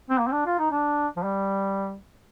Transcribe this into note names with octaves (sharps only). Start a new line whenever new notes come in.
C4
A#3
C4
D4
F4
D#4
D4
F3
G3